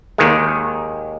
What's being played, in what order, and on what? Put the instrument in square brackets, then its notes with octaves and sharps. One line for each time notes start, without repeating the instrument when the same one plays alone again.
[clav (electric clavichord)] D#2 D#3 G#3